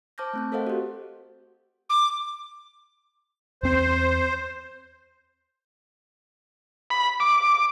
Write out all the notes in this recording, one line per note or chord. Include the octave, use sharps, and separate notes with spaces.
C5 A5 D6 F6 G6 A#6
A3 C4 G6
A4 A#4 C5 D#5 F5 F#5
F#4 G4
D6
E2 C4 C5
B5
D6